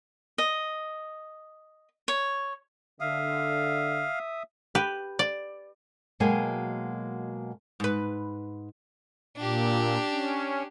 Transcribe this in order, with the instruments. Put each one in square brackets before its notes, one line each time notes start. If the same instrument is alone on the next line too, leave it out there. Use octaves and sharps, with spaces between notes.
[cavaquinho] D#5
C#5
[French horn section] D3 [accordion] E5 D#6 [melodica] F5
[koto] G4 B4
D5
[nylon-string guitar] B2 F#3 G#3 A#3 G5 G#5
[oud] G#2 B4
[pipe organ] A#2 [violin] D4 G4
[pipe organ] C#4